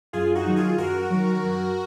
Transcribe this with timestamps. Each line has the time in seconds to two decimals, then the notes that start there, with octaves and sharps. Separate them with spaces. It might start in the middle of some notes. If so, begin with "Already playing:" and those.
0.13 F#2 F4 G#4
0.35 D#4 F#4
0.46 D#3 F#3
0.56 F4 G#4
0.78 F#2 F#4 A#4
1.10 D#3 F#3
1.43 F#2